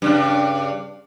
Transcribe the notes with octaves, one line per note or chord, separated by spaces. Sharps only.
G2 C#3 D4